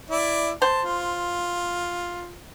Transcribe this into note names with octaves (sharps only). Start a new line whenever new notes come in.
E4 D5 E5
C5 A5
F4